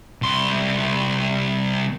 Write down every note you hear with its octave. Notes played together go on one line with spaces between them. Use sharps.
C2 C6